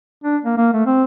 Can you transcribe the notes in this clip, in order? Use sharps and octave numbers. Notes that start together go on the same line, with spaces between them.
D4
A#3
A#3
A3
C4